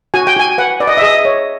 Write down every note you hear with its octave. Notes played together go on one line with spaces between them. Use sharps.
F#4 G#5
G5
F#4 G#5
B4 F#5
B4 D5
D#5
E5
G#4 D#5
C#5